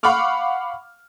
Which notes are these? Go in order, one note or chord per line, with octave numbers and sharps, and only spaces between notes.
F5 F#5 B5 C#6 D6 F6